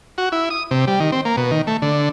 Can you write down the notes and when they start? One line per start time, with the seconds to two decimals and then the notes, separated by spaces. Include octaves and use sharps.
0.18 F#4
0.32 E4
0.50 D#6
0.71 C3
0.87 G3
1.00 D#3
1.12 C4
1.25 A#3
1.37 B2
1.51 D#3
1.67 A3
1.82 D3